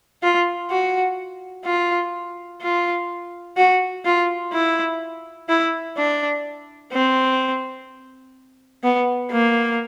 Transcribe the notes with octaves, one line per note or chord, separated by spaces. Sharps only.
F4
F#4
F4
F4
F#4
F4
E4
E4
D4
C4
B3
A#3